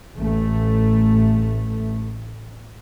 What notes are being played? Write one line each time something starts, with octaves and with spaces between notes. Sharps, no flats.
A1 A3